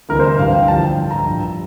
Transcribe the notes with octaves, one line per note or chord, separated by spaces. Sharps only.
D2 C3 E3 G3 A#4
C5
G2 E3 G3 F5
G5
D2 D3 F3 A5
G5
A2 E3 G3
A#5
G2 F3